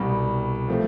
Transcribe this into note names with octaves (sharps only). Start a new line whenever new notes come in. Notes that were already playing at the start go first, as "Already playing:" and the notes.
Already playing: C2 B2 G3
F3 A3 C4